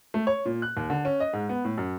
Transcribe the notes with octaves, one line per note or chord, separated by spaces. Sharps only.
A3
C#5
A#2
F#6
D#2
D3
C#4
D#5
G#2
B3
A2
F#2